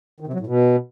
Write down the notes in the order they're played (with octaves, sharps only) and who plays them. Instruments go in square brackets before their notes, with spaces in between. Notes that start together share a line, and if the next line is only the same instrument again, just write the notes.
[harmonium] D#3
C3
F#3
A2
B2